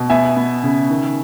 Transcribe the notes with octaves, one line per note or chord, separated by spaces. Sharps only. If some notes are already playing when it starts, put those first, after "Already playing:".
Already playing: B2
B3 E5 G#5
B3
C#3
D#3